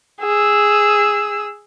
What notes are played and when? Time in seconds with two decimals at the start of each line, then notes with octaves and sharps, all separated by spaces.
0.22 G#4 E6